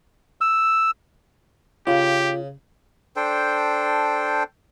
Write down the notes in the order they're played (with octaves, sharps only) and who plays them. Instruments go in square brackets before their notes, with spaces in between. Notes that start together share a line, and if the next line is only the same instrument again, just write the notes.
[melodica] E6
[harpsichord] C#3 [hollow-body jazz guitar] F4 [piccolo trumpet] G4
[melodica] D4 A4 C5 G5